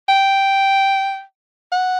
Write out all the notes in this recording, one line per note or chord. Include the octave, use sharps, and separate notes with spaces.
G5
F#5